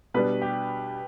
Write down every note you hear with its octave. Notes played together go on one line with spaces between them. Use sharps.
B2 G3 D4 B4
G4